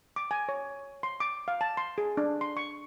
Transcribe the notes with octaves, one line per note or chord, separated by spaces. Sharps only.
D6
G#5
C#5
C6
D6
F5
A5
C6
G#4
D4
C6
C#6